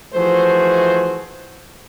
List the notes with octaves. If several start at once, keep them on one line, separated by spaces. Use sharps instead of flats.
E3 F3 A3 F#4 G#4 C5